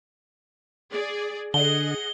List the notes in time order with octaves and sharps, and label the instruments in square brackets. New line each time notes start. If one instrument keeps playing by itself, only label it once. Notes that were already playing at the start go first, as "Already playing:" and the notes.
[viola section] G#4 D5
[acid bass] D3 [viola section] G#4 D#5 F#5 [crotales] G7